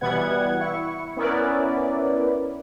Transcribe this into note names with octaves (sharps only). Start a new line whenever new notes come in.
B2 E3 G3 B3 F#5 G#6
E4 C#6
B3 C#4 E4 A#4 B4 D5